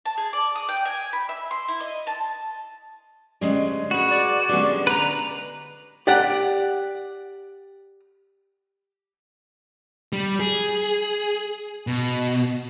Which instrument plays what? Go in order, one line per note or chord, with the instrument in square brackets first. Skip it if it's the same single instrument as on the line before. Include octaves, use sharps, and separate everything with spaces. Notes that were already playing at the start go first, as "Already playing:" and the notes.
[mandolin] A5
G#4
D5
D#6
G5
G#5
B5
E5
C6
E4
D#5
A5
[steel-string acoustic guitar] D2 G#3 C#4 [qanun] G3 D#5
[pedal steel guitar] F#4 [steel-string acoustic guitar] G#4 B4
[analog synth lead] D5
[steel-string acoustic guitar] D3 G#3 [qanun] G3 B3 C#4
[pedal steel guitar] B4 A#5 [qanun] F#5
[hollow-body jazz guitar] G4 D5 F#5
[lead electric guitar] G3
G#4
B2